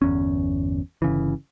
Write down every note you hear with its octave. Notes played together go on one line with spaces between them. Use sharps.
G1 E2 C#4
G1 C#3 E3